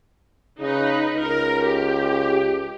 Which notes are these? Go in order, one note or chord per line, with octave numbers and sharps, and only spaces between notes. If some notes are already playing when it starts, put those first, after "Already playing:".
C#3 D#4 B4
C#2 A#4
G4